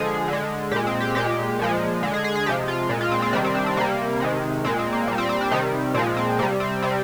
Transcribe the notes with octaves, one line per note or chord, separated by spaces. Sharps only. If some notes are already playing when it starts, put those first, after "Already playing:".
Already playing: D3 F3 G#3 G#4
D3 G#3
A#2 G#3 G4
C4
G4
A#2 G#3 G4
A#2 F3 G#3
D3 G#3
G#4
G#4
G#4
C3 F3 G#3 G4
F4
A#2 G#3
F4
C4
C4
C3 D#3 G3 D4
C4
D4
C4
C3 G3 A#3
C3 D#3 G#3
A#2 G#3 C4
C4
A#3
A#2 G3 A#3
C4
C4
D4
C3 D#3 G3 D#4
A#2 F3 G#3 C4
C4
C3 G3 A#3
C4
C3 G3 C4